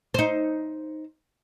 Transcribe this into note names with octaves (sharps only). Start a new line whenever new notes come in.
D#4 C5